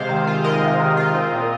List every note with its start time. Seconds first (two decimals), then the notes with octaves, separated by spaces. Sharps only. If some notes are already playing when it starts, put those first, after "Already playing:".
Already playing: C3 G#3 C5 F5
0.09 D#3
0.27 F4
0.44 G#3 A#4 D#5
0.62 C3
0.80 D#3
0.97 F4
1.15 C4
1.33 A#2